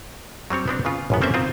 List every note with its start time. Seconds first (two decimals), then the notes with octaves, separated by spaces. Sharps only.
0.50 F#3 G3 C4 C#5
0.68 B3 C4 D4
0.85 C#3 B3 F4
1.10 A1 F#2 B3
1.21 A#3 C4 C#4 A4 C5 E5
1.34 D#3 C4 F4